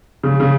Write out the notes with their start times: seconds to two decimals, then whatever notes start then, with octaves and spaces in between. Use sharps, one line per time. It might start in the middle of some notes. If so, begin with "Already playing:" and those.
0.24 C#3
0.40 C#3